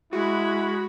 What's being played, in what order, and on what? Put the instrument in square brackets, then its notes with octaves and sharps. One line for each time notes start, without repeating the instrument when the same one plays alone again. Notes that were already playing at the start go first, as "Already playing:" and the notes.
[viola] G#3 B5 [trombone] E4 [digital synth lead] F#4